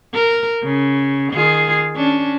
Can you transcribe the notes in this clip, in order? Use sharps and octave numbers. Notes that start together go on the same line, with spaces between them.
A#4
C#3
D#3 F4 G#4
C#4 D4